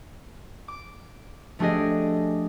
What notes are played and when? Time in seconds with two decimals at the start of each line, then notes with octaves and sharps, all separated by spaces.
0.68 D6
1.59 F3 A3 D4 G4 G#4 D#5